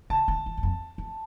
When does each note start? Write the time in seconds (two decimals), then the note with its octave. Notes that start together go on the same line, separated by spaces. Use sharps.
0.10 C#3 A5
0.28 D3
0.46 E3
0.57 E2
0.63 F2
0.98 F2